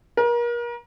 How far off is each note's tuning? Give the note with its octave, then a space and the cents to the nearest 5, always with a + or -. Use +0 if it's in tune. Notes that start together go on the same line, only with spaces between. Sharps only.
A#4 +35